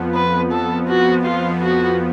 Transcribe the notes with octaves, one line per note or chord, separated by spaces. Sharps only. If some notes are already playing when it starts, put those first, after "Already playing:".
Already playing: F2 F3 B3
B4
A4
F#4
F4
F#4